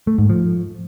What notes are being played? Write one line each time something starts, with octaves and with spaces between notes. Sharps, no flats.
A3
G#2
F3